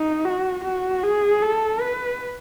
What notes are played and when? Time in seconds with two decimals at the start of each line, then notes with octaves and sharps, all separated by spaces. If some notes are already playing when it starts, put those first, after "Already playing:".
Already playing: D#4
0.25 F#4
0.64 F#4
1.03 G#4
1.42 A4
1.81 B4